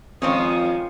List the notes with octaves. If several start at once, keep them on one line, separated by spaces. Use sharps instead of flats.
F2 D#3 F3 G#3 C4 C#4 D#6